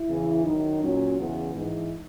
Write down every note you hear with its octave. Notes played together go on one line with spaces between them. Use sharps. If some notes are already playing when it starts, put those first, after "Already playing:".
Already playing: E4
E2 C#3 E3
F#2 D#3 F#3 D#4
A#2 F#3 C#4
E2 C#3 E3 B3
G#2 E3